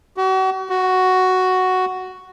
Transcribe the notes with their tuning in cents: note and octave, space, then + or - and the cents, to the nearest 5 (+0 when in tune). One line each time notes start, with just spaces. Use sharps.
F#4 +40
F#4 +5